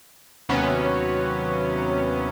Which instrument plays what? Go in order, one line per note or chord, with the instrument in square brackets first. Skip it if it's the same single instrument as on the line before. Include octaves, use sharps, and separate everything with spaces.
[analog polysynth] D#2 C3 F#3 B3 C#4